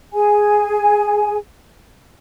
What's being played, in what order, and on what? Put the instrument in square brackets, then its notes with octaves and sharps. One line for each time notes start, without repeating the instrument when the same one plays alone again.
[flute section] G#4 G#5